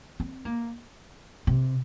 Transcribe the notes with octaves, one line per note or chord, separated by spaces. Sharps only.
C4
A#3
C3